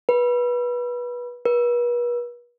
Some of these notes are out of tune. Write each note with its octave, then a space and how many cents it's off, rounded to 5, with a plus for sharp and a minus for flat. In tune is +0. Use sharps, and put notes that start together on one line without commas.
B4 -20
B4 -40